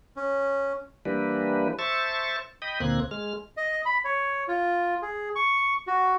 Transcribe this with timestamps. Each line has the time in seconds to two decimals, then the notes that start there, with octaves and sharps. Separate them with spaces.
0.16 C#4
1.05 E3 G3 A#3 D4 B4
1.79 C5 E5 A5 C#6 A6
2.62 D#5 G5 B5 D#6
2.80 D2 A#2 A#3 C4 F#6 G#6
3.11 G#3 F6
3.57 D#5
3.85 B5
4.04 C#5
4.48 F4
5.02 G#4
5.35 C#6
5.87 F#4